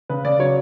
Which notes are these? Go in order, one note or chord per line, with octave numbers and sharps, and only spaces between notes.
C#3 B4
C#3 D5
F#3 C#5